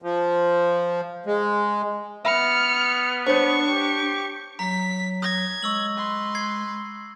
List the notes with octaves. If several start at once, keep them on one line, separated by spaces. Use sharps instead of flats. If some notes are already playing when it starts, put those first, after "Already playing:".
F3
G#3
B3 E5 B5 F6 C#7
D4 C5 C#5 C#6
G4
F#3 A#5 B6
D#6 G#6 A#6
G#3 C#6 E6 F#7
B4 C6
G#6 C7